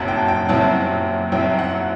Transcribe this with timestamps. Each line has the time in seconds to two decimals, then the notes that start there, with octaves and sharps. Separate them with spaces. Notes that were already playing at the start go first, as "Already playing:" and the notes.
Already playing: F#1 F#2 F#3 C4 E4 F#5 A5
0.08 G5
0.28 G5
0.49 F#1 F#2 F#3 C4 E4 A5
1.32 F#1 F#2 F#3 C4 E4 G5
1.59 F#5